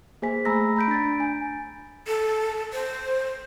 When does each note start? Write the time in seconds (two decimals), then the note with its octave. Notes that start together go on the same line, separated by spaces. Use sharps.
0.22 A#3 G#4 C5 G#5 B6
0.45 A3 A#5 B5 E6 A#6
0.76 A#5 B5 G6 B6 D7
0.88 D4 A6
1.20 G#5
2.07 A4
2.73 C5